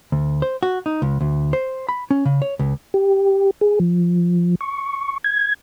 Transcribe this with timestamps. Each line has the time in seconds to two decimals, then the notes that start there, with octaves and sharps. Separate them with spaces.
0.12 D2
0.42 C5
0.63 F#4
0.86 D#4
1.02 C#2
1.21 D2
1.53 C5
1.89 B5
2.11 C#4
2.25 C#3
2.42 C#5
2.59 C#2
2.94 G4
3.61 G#4
3.80 F3
4.61 C#6
5.24 G#6